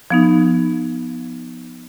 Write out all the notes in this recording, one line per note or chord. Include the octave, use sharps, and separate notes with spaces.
F3 B3 D#4